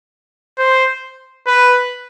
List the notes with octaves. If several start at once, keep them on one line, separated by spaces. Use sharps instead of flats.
C5
B4